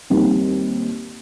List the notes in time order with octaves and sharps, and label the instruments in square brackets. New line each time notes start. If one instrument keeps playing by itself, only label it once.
[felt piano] D#2 D#3 G3 C4